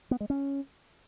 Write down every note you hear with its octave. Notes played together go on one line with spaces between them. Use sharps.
B3
G#3
C#4